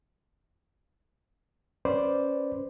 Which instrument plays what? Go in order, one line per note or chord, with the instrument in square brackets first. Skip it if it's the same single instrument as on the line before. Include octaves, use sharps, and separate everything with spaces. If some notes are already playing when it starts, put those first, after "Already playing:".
[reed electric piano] C#4 B4 C5 D5